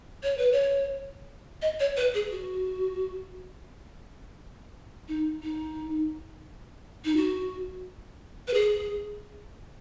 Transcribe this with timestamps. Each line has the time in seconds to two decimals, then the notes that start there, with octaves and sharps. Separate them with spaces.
0.23 C#5
0.38 B4
0.52 C#5
1.62 D#5
1.80 C#5
1.97 B4
2.14 G#4
2.31 F#4
5.08 D#4
5.43 D#4
7.05 D#4
7.16 F#4
8.48 B4
8.54 G#4